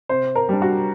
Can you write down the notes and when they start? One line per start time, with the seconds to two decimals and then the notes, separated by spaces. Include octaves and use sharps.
0.09 C3 C5
0.35 A#4
0.49 G3 D4
0.62 F#4